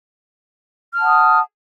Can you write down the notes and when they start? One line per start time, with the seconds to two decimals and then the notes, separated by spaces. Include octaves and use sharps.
0.94 F6
0.98 A5
1.02 F#5
1.06 D#6